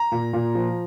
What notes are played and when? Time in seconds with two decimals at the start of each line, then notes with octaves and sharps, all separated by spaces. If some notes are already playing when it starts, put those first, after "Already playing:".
Already playing: A#5
0.12 A#2
0.33 A#2
0.55 F3